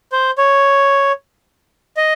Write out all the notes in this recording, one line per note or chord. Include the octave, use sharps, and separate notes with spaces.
C5
C#5
D#5